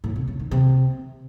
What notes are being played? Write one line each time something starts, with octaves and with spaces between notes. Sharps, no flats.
A2
C3
C#3
D#3
C3